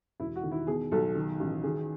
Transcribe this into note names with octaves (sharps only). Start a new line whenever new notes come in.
E1 E4
F#4
D#3
E4
B2 G#4
B1 A4
D#3
A1
D#3 G#4